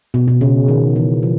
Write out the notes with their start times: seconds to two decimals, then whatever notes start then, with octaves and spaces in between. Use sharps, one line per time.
0.14 B2
0.28 B2
0.41 C#3
0.68 D#3
0.96 E3
1.23 F3